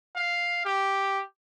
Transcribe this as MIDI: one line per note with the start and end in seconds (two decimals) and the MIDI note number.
0.16 0.60 77
0.66 1.22 67